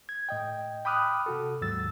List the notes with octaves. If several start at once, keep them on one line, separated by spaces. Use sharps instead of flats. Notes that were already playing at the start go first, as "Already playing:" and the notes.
G#6
A2 D#5 G5
G5 B5 D6 D#6 F6 F#6
C3 F#4 A4
D#2 G#2 F#3 E6 A6